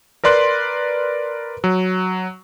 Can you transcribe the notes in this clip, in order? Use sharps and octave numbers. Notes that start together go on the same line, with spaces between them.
A#4 B4 D5 C6 F#6
F#3